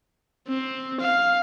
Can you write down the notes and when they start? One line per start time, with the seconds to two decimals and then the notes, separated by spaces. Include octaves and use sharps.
0.48 C4
1.00 F5